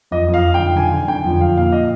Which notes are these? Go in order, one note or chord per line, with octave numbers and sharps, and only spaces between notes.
F2 D#5
F2
F5
F2
G5
D3
D3 G#5
D3
D3 G5
F2
F3 F5
A#2 F5
D#5